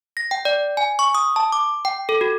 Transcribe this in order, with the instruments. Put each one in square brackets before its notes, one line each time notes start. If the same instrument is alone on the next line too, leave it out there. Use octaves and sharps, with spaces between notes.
[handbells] A#6
G5
D5
G#5
C#6
D#6
A5
D6
G5
A4
F#4